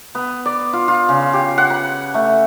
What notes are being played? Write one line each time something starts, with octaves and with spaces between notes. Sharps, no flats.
B3
D5
F4
F4
C#3
G4
F#5
B5
A3